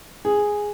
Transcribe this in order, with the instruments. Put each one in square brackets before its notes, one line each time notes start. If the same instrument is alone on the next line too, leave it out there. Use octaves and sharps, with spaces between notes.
[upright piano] G#4